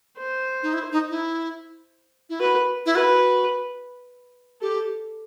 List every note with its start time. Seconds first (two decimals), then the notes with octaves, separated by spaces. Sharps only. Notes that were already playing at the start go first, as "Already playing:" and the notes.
0.18 C5
0.63 D#4
0.73 E4
0.92 D#4
1.10 E4
2.30 E4
2.40 F#4 B4
2.86 E4
2.95 F#4 B4
4.61 G4 A4